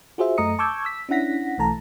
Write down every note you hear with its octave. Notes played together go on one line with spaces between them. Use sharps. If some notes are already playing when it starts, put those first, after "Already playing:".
F4 F#4 G#4 C5 E5
F#2 A3 D#5 A#5 D#6 C#7
A5 C#6 D6 E6 G6 G#6
E6 B6
C#4 D4 E4 F#5 A#6 B6
B1 E3 A3 A5 A#5